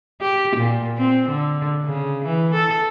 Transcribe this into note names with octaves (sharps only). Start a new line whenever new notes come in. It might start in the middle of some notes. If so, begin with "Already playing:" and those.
G4
A#2
C4
D3
C#3
E3
A4